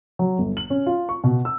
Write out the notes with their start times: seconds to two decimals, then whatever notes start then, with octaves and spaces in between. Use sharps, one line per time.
0.19 F#3
0.38 G1
0.57 F#7
0.70 C#4
0.86 F4
1.09 C#6
1.24 B2
1.45 E6